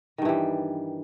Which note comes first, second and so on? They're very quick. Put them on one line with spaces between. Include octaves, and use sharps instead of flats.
D#3 G2 E3 G3